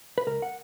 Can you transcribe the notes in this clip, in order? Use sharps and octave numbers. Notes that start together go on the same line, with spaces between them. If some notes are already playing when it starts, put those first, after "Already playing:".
B4
C#2 A#4
F#5